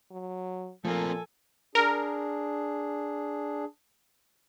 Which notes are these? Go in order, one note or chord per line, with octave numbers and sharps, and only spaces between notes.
F#3
A#2 F3 A3 C4 A4 A#4 G#5
D4 G#4 A#4